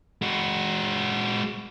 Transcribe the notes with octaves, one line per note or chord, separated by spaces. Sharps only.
G#3 F#4